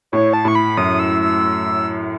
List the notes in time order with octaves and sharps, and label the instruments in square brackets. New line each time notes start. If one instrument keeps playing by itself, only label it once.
[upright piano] A2 [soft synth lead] C#5
[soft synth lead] A5
[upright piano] A2 [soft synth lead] C#6
[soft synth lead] B5
[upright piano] F#2 [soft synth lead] D#6
[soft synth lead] E6
E6